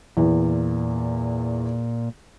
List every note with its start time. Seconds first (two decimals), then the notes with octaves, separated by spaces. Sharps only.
0.17 E2 A#2